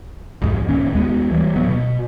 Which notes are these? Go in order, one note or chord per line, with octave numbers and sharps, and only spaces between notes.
B1 F2 G#2
F#1 D#2 A#2 C#4
D#2 G#3 B3
E3 G3
D1 F#3 B3
B2